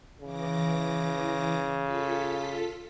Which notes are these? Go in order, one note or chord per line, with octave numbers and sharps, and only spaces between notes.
C#3 E3 D6 A#6
F4 A4 B6